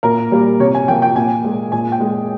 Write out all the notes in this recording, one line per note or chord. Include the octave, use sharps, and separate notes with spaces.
A#2 A#4
G3 A#3
C3 C#5
G#5
F3 A#3 G5
G5
A#2 G#5
G#3
A#2 G#5
G5
G#3